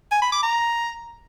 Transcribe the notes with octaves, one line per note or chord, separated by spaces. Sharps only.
G#5
B5
D6
A#5